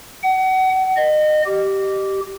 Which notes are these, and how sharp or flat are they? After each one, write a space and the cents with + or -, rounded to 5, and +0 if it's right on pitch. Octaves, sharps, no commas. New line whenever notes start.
F#5 +30
D#5 -30
G4 -15